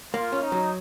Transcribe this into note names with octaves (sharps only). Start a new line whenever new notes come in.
A#3 F4
C#4
D#4
F#3